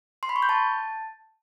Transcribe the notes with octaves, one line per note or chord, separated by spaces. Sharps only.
C6
B5
C#6
G6
A5